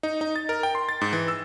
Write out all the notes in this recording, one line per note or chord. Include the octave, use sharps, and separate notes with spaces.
D#4
D#4
A6
A#4
G5
C6
A6
G#2
E3
E6